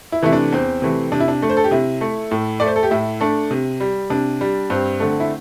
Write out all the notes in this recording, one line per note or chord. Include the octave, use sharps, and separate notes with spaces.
E4
C3 E3 A3 E4
D4
E2 C4
C3 E3 A3
C3 D4
E4
D4
A3
C5
A4
G4
C3 E4
A3
A2
A3 D5
C5
A4
G4
A2 E4
A3 D4
C3
G3
C3 D4
G3
G2 C4
D3 A3
E4